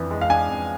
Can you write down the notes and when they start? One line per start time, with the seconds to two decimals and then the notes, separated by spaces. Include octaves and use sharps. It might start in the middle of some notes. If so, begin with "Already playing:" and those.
Already playing: F2 E3 D4
0.11 G#3
0.21 F5
0.30 D4 G#5
0.49 F2